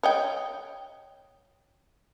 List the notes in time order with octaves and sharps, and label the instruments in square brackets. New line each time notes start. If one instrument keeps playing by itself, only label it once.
[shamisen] C#5 D#5 G5